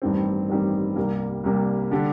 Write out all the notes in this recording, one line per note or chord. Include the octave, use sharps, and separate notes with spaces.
A1 G2 D#3 G3 C4
A1 G2 D#3 G3 C4
C2 C3 G3 A#3
C2 C3 G3 A#3
D3 G3 D4 G4